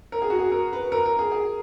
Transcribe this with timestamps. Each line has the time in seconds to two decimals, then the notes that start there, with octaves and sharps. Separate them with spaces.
0.12 A#4
0.22 G#4
0.30 F#4
0.39 G#4
0.52 A#4
0.73 B4
0.92 A#4
1.06 A#4
1.19 G#4
1.32 G#4